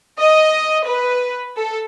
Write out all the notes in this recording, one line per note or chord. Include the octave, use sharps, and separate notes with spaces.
D#5
B4
A4